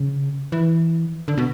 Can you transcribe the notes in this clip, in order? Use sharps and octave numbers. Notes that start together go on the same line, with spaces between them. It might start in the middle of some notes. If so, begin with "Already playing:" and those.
Already playing: C#3
E3
D3
B2